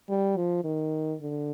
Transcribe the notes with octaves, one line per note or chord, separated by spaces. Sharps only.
G3
F3
D#3
D3